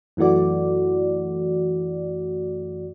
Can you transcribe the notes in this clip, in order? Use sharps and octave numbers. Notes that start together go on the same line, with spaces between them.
F#2 E3 A3 F#4 D5